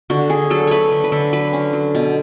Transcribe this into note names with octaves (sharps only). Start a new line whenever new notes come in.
D3 F#4
D3 G#4
F#3 A4
A3 B4 C#5
D3
B4
D3 A4
F#3 B4
C#4
F#3
B2